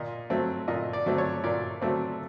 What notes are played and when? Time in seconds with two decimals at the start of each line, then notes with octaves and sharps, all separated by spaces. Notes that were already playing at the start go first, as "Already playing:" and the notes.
Already playing: A#2 D#5
0.30 F#3 A3 C4
0.68 A#2 D#5
0.93 D5
1.06 F#3 A3 C4
1.18 C#5
1.44 A#2 D5
1.82 F#3 A3 C4